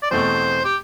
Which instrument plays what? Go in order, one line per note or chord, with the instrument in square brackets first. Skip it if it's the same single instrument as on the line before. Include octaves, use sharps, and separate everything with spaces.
[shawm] D5
[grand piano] E2 B2 A3 C4 [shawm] C5
[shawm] G4